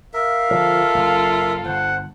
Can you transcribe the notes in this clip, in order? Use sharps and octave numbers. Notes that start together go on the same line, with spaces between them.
A#4 E5 F5
D3 F3 F4 A4
F#1
G1 C5 F#5